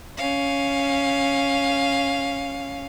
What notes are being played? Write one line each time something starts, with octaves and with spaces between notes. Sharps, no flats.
C#4 F5